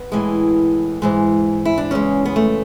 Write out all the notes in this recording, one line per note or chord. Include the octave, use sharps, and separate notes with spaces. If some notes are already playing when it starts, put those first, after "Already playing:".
Already playing: B3
A2 E3 G#3
G#2 E3 G#3
E4
D4
E2 C#3 G#3 C#4
B3
A3